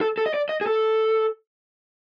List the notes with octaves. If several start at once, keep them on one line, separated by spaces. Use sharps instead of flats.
A4
A4
D#5
D5
D#5
G#4
A4